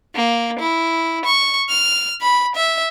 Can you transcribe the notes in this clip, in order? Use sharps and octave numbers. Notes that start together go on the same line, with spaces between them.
A#3
E4
C#6
F6
B5
E5